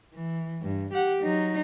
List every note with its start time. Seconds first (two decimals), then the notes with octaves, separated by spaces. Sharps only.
0.14 E3
0.62 G2
0.93 G4 F#5
1.23 F#3 D#4